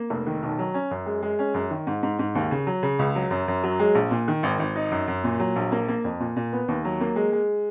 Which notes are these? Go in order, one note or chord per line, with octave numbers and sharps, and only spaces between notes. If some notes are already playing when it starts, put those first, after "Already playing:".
Already playing: A#3
F1
D#3
B1
F#3
C#4
F#2
G#3
G#3
C#4
F#2
D#3
G#2
G#2
G#2
D#2
C#3
F#3
C#3
C#2
F#3
F#2
F#2
F#3
G#3
A#1
A#2
D#3
G#1
G#1
D#4
F#2
F#2
A#2
F#3
A#1
A#3
A#3
F2
A#2
A#2
B3
D#2
F#3
A#3
G#3
G#3